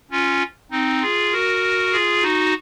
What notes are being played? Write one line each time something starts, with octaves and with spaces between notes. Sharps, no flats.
C#4 F4
C4 D#4
F4 G#4
F#4 A#4
F4 G#4
D#4 F#4